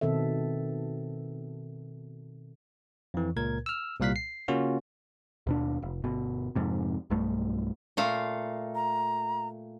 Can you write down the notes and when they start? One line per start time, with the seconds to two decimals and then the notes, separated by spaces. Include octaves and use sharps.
0.01 B2 D#3 C4 A4 E5
3.14 F2 E3
3.36 C#2 A#2 A#4 G#6
3.66 E6 F6
4.00 C2 A#2 G3 F5 F#6 B6
4.16 C7
4.48 C#3 A#3 C#4 F4 F#4
5.47 D#2 B2 D4
5.82 F1
6.04 G1 B2
6.55 F2 G#2 C3
7.10 B1 G2 A3
7.97 A#2 A3 F5
8.75 A#5